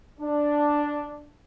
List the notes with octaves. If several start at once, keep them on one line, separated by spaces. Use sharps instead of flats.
D4